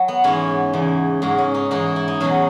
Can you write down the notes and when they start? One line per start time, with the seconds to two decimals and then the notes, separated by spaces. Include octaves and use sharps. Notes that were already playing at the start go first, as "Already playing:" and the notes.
Already playing: F#3
0.08 B3
0.24 G#2 E3 C#4
0.73 E2 C#3 E3
1.22 G#2 F#3 C#4
1.38 C#4
1.54 D#4
1.71 G#2 E3 D#4
1.96 E4
2.08 D#4
2.20 E2 B2 F#3 C#4